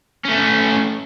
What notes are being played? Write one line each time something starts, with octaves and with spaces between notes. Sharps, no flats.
A3 C#4